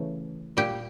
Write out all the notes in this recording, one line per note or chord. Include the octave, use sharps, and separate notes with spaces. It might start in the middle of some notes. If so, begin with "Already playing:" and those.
Already playing: C#3 E3 A3
A#2 G3 G4